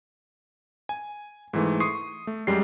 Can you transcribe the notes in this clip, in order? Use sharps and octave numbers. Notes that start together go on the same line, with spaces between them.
G#5
G#2 E3 A3
C6 C#6 D#6 C7
A3
F#2 G3 G#3 G4 C7